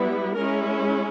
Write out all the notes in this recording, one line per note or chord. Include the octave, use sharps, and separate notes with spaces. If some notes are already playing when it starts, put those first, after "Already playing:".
Already playing: G3 B3 E4
G#3 C#4 E4 A#4